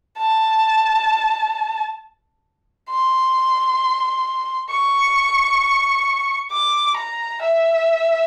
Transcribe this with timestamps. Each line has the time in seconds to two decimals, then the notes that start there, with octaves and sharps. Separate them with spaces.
0.18 A5
2.90 C6
4.71 C#6
6.51 D6
6.97 A#5
7.42 E5